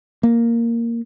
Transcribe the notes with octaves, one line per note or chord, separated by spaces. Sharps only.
A#3